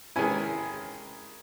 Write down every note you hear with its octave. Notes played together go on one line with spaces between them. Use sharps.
D#3 G#3 C#4 E4 G#5